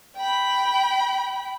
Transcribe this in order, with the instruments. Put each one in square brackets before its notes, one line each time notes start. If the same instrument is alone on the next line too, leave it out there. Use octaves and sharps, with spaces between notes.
[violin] G5 B5